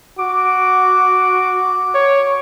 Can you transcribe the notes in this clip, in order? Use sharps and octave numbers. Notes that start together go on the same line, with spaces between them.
F#4 D6
C#5